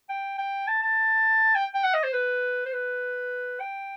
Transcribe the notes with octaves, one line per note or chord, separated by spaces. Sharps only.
G5
G5
A5
A5
G5
G5
F#5
D#5
C5
B4
C5
B4
G5